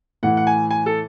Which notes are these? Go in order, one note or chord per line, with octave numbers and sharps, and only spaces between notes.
A2 E3 F#5
F#5
G#5
G#5
A4